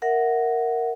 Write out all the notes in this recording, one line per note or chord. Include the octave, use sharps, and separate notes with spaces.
A#4 E5 F#5